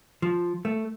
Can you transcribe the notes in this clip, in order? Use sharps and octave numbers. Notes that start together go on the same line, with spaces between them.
F3
A3